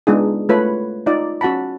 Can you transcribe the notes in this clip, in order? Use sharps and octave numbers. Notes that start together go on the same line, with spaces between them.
G#3 B3 D4 D#4 F4 G#4
A3 F4 B4 C#5 B5
D#4 F4 D5
C#4 F#4 F#5 A5 B5